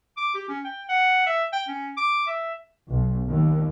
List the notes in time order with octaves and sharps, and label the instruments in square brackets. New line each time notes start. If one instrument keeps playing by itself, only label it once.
[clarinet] D6
G4
C#4
G5
F#5
E5
G5
C#4
D6
E5
[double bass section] B1
D#2